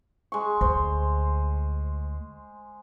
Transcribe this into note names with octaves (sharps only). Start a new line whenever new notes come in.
G#3 C#6
D2 C5